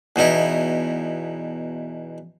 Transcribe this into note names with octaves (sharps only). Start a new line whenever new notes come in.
E2 B2 D#4 E4